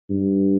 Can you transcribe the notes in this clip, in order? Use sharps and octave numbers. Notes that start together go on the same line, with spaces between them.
G2